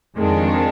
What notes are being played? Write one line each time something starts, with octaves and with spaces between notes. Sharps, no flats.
F2 D#3 G#3 D4